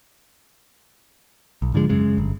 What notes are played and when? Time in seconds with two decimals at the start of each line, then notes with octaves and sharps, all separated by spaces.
1.62 B1
1.74 G#2 D3 F3 G#3
1.89 F#2 C#3 G#3
2.18 G1